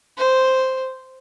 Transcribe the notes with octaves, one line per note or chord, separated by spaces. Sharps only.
C5